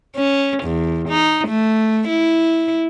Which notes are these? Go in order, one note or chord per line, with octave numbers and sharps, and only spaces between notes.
C#4
E2
D#4
A3
E4